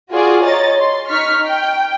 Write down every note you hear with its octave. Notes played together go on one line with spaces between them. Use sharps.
F4 F#4 G#4 D5
C#5 D#5 A#5 A6
C6
D#4 C#6 F6 B6
G5